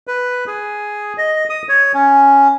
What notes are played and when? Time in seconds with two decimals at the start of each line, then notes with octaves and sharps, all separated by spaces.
0.07 B4
0.47 G#4
1.18 D#5
1.50 D#6
1.69 C#5
1.94 C#4